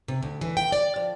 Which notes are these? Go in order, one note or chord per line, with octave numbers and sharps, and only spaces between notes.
C3
D2
E3
G5
D5
F3